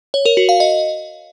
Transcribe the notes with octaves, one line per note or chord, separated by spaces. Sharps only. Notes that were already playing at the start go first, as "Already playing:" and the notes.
C#5
A#4
F#4
F5
D#5